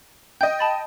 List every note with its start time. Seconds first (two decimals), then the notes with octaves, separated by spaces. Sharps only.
0.41 D#5 G5 G6
0.59 A5 B5 A6